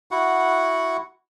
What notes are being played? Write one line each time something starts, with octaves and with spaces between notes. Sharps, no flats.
E4 F#4 F#5